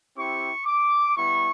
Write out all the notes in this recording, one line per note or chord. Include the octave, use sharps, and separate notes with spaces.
C4 E4 G4 C#6
D6
G3 B3 E4 C#6